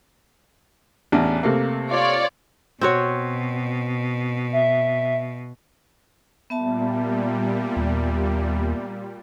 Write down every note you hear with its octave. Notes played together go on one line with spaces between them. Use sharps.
A1 E2 D4
C3 A3 A#3
F4 C#5 D5
B2 C4 F#4 C#5
E5
A#2 G3 B3 E5 A5
D#2